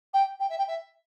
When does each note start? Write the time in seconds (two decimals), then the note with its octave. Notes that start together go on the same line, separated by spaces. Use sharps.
0.14 G5
0.40 G5
0.50 E5
0.58 G5
0.68 E5